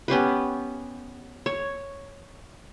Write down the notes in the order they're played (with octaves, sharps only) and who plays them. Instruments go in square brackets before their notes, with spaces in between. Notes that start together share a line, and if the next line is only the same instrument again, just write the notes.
[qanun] B3 C#4 G4 B4
C#5